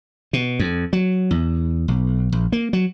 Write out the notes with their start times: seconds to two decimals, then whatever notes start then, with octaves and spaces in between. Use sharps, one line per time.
0.33 B2
0.59 F2
0.93 F#3
1.31 E2
1.88 B1
2.32 A#1
2.52 A#3
2.73 F#3